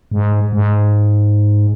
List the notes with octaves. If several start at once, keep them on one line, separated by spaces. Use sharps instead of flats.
G#2
G#2